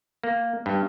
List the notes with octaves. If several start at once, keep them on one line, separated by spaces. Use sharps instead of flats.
A#3
G2